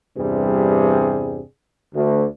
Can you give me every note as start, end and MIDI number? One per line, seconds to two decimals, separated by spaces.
0.17 1.40 40
0.17 1.40 43
0.17 1.40 48
0.17 1.40 55
0.17 1.40 68
1.94 2.24 38